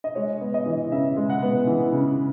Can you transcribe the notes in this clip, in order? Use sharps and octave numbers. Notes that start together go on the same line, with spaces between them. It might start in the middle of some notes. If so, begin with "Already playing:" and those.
D#5
G#3 C#5
B3
D#5
E3
C#3 E5
G#3
F#5
B3
E3
C#3